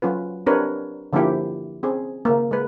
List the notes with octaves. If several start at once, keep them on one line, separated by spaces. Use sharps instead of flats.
F#3 C#4 F4 B4
C4 D4 G4 A#4 B4 C#5
D3 F3 A#3 C#4 E4 G4
C4 C#4 G#4
C#3 A#3
G#3 A#4 B4